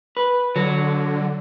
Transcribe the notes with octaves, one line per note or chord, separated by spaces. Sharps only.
B4
D3 F#3